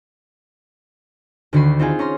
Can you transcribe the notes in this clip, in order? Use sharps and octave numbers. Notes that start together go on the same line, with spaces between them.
D2 D3 D#3 F#4 B5 C7
C4 D#4 F4 G#4
C#4 A#5 C6